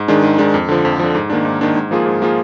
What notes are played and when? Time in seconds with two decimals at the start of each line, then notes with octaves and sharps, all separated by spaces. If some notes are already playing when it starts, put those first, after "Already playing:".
Already playing: G#2
0.08 D#3 G#3 D4
0.23 G#2
0.38 D#3 G#3 D4
0.54 F2
0.69 D3 F3
0.85 F2
0.99 D3 F3
1.15 G#2
1.30 D#3 A#3 D4
1.45 G#2
1.61 D#3 A#3 D4
1.75 G#2
1.91 F3 A#3 F4 G#4
2.06 G#2
2.22 F3 A#3 F4 G#4